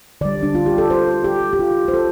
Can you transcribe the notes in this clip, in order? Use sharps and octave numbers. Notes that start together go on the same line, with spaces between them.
D3 G3 D5
D4
F4
G4
A4
C5
G4
G4
F4
C5
A4